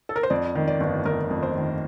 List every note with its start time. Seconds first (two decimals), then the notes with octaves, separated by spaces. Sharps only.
0.09 A4
0.16 A#4
0.23 C5
0.30 F2 D5
0.55 D#3
0.68 D5
0.80 G1
1.05 G1 A#4
1.30 F2
1.43 C5
1.55 D#3